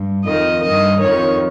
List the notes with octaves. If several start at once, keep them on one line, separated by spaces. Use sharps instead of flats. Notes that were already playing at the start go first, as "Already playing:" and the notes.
Already playing: G2
F2 D#3 D#5
G2 D#3 D#5
F2 D#3 C#5